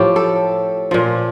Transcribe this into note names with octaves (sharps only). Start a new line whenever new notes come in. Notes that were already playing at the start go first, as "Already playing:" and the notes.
Already playing: A2 F3 G4
A4
A#2 F3